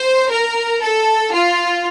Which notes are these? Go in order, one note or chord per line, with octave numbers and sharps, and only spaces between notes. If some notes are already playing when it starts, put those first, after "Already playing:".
Already playing: C5
A#4
A4
F4